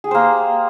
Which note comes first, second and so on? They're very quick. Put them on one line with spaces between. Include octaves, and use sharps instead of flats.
G#4 G4 C5 A#3